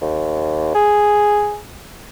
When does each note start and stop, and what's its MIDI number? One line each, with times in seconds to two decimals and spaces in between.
0.02 0.73 39
0.75 1.58 68